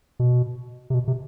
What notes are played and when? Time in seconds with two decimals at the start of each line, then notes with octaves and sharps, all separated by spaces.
0.19 B2
0.90 C3
0.94 B2
1.08 C3